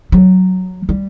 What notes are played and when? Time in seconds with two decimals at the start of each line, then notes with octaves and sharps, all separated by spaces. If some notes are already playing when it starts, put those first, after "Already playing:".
0.12 F#3
0.89 G3